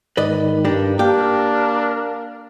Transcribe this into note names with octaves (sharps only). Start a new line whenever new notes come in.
G#2 D#3 B4 D5 D#5
G2 G3 D4 A#4
A#3 D4 G4 A#4